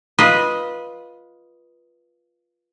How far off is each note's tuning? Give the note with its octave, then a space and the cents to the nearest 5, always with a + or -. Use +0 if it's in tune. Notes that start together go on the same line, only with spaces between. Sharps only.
F4 +0 B4 -15 D#5 +0